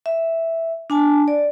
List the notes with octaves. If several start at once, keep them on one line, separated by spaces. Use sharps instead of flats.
E5
D4 G#5 A5
D5